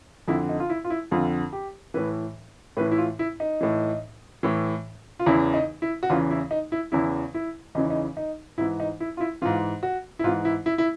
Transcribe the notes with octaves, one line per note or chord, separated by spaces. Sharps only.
F2 D3 E4
D#4
F4
E4
F4
E4
F2 D3 F4
G4
A2 E3 B4
A2 E3 B4
E4
F4
E4
D#4
A2 E3
A2 E3
F4
E2 C#3 E3 E4
D#4
E4
F#4
E2 C#3 E3 F4
E4
D#4
E4
E2 C#3 E3 E4
E4
E2 C#3 E3 D#4
D#4
D#4
G#2 E3 E4
D#4
E4
F4
E4
G#2 E3 F4
F#4
E4
G#2 E3 F4
E4
E4
E4